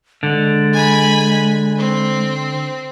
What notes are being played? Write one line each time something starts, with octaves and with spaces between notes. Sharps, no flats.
D3 G#3
G#5 B5
C4